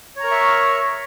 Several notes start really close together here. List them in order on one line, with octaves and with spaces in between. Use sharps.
C#5 A#5 A#4 C#6 E5